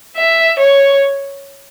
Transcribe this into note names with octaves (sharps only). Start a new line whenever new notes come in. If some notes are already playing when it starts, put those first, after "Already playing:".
E5
C#5